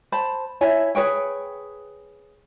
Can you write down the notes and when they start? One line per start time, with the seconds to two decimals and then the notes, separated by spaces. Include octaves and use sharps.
0.12 C5 A5 B5
0.61 E4 C#5 E5 G#5
0.95 G#4 B4 C#5 G5